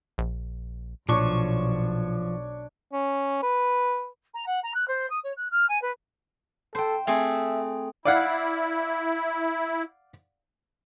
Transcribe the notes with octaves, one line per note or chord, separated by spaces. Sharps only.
A#1
B1 A#2 F3 D4 C#5 C#6
C#4
B4
A#5
F#5
A#5
F#6
C5
D#6
C#5
F#6
F6
G#5
B4
A4 C5 G5
A3 C4 G#4 E5
E4 D5 F5 F#5